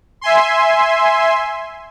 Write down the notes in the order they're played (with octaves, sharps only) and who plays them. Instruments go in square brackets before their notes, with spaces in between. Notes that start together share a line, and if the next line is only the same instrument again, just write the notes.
[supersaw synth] E5 G#5 C6